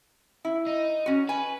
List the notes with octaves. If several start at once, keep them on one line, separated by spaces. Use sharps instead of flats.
E4
D#4
C#4 F#4
B4 G#5